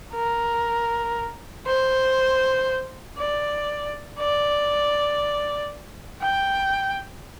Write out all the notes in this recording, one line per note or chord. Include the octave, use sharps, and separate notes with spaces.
A#4
C5
D5
D5
G5